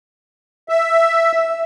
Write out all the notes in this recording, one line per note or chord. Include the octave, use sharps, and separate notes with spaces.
E5